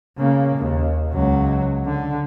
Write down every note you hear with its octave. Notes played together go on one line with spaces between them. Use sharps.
C#3 A#3
D#2
C#2 F#3
D3